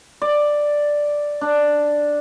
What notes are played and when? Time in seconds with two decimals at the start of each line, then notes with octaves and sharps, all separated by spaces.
0.22 D5
1.41 D4